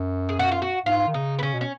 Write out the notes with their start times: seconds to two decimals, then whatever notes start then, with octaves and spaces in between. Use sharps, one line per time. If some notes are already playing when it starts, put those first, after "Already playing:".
Already playing: F#2
0.29 G#4
0.39 F#4
0.52 F4
0.62 F#4
0.86 G#2 F4
1.07 D#3
1.14 C#3 D#4
1.39 B3
1.43 C#3 C#4
1.54 B2
1.61 C#4